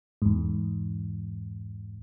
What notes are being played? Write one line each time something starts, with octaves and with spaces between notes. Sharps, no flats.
E2 G#2